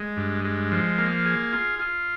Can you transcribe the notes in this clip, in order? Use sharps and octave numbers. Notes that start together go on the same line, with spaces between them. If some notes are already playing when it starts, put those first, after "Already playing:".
Already playing: G#3
G2
G#3
F3
A#3
G#4
F4
F4